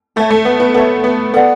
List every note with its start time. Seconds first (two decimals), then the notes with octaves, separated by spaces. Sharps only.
0.16 A3 A4 C#5 E5
0.31 A3
0.45 B3
0.60 B3
0.74 B3 A4 C#5 E5
1.04 B3
1.34 B3 A4 D5 F#5